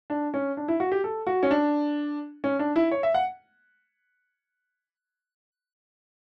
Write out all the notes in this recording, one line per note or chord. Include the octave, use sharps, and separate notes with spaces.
D4
C#4
D4
E4
F#4
G4
A4
F#4
C#4
D4
C#4
D4
E4
C#5
E5
F#5